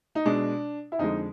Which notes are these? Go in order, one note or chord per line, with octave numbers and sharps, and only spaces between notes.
D#4
B2 G#3 D4
E4
F2 D3 F3 G#3 D#4